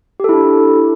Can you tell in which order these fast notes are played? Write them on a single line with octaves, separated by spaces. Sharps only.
G4 A4 E4 D4